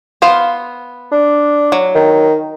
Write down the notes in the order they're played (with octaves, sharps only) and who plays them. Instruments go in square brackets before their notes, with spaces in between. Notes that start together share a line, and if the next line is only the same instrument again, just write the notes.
[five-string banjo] B3 C5 F5
[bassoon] D4
[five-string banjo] F#3
[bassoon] D#3